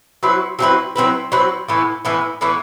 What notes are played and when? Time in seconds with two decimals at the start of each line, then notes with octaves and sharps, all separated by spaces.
0.23 F#3 C4 E4 B4
0.59 F#3 C4 E4 B4
0.96 F#3 C4 E4 B4
1.32 F#3 C4 E4 B4
1.68 A2 E3 B3 E4
2.05 A2 E3 B3 E4
2.41 A2 E3 B3 E4